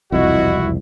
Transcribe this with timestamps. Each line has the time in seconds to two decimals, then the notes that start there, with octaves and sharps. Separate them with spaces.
0.12 E1 C2 F2 E4 F#4 D#5